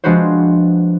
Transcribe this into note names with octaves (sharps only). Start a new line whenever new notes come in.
F3 G#3 D4 F#4 B4 C5